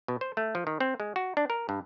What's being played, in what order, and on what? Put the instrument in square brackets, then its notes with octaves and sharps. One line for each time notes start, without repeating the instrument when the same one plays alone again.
[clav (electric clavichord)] B2
C5
A3
F3
D#3
C4
G#3
F#4
D4
A#4
G2